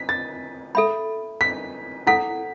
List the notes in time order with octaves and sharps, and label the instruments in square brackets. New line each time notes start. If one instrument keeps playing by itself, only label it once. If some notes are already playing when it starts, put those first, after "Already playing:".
Already playing: [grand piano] B6
A6
[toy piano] A4 E5 B5
[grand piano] B6
[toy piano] E4 A4 F#5 [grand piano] B6